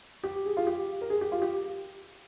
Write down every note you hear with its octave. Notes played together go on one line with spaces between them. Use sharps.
G4
G#4
F4
G4
A#4
G#4
G4
F4
G4